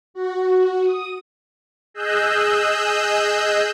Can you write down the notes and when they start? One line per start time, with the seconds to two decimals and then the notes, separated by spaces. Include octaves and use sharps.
0.14 F#4
0.83 D#6
1.94 G#4 D#5 E6 F#6 G6